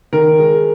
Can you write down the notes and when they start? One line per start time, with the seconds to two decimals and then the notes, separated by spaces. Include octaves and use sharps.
0.13 D#3 A#4
0.39 G#3